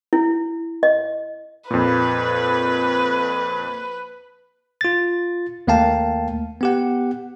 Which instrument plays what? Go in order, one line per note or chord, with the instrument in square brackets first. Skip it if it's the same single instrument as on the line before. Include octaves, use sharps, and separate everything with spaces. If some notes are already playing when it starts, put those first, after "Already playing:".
[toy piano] E4
D#5
[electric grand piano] F2 A#2 [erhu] B4
[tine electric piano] F4 A6
D#2 A3 A#3 F5 G5 A5
B3 G4 F#5